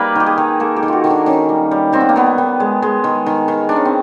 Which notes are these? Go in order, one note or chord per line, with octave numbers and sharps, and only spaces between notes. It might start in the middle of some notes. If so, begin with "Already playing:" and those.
Already playing: G3 A#3 D#4 B4
D#3 G4
G#4
D#3
A#3 A4
G4
D#3
F4 F#4
D#3
D4
D#3 C#4
G3
G3
D#3 C4
B3
A#3
D#3 B3
D#3
G#3
G#3
D#3
D#3
D#3
D#3 D4
C#4
C4